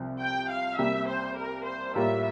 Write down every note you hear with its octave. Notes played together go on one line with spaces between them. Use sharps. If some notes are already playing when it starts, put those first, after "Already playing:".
Already playing: C2 C3 F3 C4
G5
F5
C2 C3 G3 A#3 E5
C5
A#4
C5
A2 G3 A#3 F4 A#4 E5